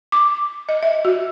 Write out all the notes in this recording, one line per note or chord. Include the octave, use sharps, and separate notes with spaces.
D6
D#5
E5
F#4